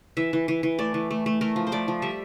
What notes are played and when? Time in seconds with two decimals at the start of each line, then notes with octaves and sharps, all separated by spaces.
0.17 E3 E5
0.33 E3
0.48 E3
0.63 E3
0.79 A3 D5
0.94 E3
1.11 A3
1.26 A3
1.41 A3 A#4
1.56 F3
1.67 C5
1.72 A3 D5
1.88 F3
2.02 G3 E5